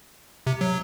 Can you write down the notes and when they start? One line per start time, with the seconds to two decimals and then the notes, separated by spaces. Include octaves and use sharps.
0.47 C3
0.61 F#3